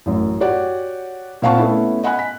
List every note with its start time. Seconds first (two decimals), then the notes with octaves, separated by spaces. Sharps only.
0.06 A1 F#2
0.41 F#4 G4 C#5 D5 F#5
1.42 A#2 C4 F5 F#5 A5 C#6
1.58 A3 B3 C#4 E4
2.03 D#5 F#5 G#5 B5 F#6
2.19 B6